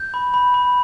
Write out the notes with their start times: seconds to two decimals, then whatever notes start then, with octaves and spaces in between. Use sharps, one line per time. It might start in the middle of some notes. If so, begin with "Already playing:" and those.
Already playing: G6
0.14 B5
0.34 B5
0.54 B5